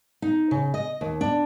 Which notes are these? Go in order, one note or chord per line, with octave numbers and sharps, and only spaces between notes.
D#4
C#3
D#5
D#2
D4